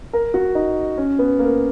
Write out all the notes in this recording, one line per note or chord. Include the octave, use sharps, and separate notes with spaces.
A#4
F#4
D#4
C#4
B3
A#3